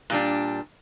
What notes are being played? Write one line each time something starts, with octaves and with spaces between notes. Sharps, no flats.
A#2 G3 D4